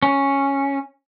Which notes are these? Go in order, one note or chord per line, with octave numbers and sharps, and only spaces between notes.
C#4